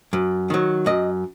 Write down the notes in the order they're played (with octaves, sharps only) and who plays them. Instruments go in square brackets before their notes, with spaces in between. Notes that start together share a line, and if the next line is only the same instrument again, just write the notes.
[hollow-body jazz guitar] F#2
D#3 F#3
F#2 D#5